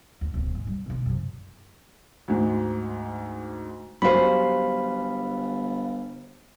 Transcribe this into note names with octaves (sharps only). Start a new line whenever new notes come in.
D2
D1 D2
G#2
G3
B2 D3
F#2 C3
D2 G#2
G1 F#3 G3 C#4 C5 F5 B5